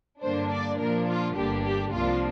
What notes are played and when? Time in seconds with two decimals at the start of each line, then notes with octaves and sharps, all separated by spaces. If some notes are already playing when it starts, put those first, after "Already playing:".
0.23 G2 D3 A#3 D4 C5
0.51 D5
0.79 A#2 F3 A#3 D4 A#4
1.08 F4
1.36 G1 G2 D3 A#3 D4 G4
1.64 G4
1.92 C2 C3 F3 A#3 D4 F4